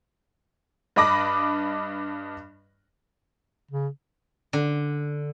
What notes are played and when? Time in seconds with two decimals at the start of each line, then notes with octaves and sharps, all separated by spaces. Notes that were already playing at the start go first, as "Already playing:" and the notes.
0.96 G2 D4 D#5 B5 D6 A#6
3.71 C#3
4.53 D3